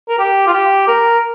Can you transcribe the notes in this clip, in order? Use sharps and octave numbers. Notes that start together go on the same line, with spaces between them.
A#4
G4
F4
G4
A#4